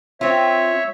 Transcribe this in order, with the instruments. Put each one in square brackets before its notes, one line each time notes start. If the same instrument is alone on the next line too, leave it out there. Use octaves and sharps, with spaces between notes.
[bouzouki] C4 F4 [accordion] C#5 E5